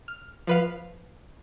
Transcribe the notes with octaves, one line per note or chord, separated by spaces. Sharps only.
F6
F3 B4 F5